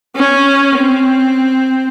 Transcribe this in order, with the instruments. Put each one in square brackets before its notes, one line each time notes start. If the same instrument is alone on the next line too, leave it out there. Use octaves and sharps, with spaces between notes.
[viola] C#4
C4